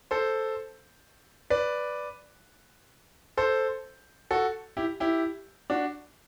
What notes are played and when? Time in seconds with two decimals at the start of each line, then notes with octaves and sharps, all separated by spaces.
0.11 A4 C5
1.50 B4 D5
3.37 A4 C5
4.31 F#4 A4
4.77 E4 G4
5.00 E4 G4
5.70 D4 F#4